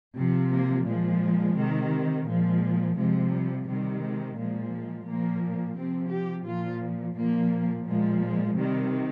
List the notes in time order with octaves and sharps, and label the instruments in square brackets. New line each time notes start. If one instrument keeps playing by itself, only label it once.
[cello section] C3 F3
A#3
A#2 F3 G#3
C3 D#3
A#2 F3 G#3
C3 F3 G#3
G3
C3 D#3 G3
G#3
A#2 F3 G#3
G#3
A#2 F3 A#3
C3 F3 C4
G4
A#2 F3 F4
A#2 F3 A#3
A#2 F3 G#3
G#3
C3 D#3 G3